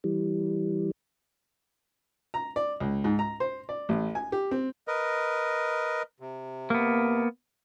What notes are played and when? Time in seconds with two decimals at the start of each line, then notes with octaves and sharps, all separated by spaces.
0.04 E3 G3
2.34 A#5
2.56 D5
2.80 C#2
3.04 G#2
3.19 A#5
3.40 C5
3.69 D5
3.89 A1
4.15 G#5
4.32 G4
4.51 C4
4.88 A#4 B4 D#5
6.20 C3
6.70 A#3 B3